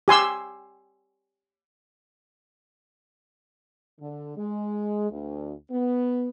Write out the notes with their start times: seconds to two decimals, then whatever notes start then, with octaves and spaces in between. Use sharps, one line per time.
0.08 G4 G#5 C6 E6
4.01 D3
4.37 G#3
5.11 D2
5.72 B3